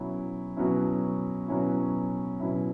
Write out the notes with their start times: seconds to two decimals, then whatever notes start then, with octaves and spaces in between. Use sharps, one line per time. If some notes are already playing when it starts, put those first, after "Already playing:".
Already playing: B2 F#3 C#4 E4
0.57 B2 F#3 C#4 E4
1.48 B2 F#3 C#4 E4
2.40 B2 F#3 C#4 E4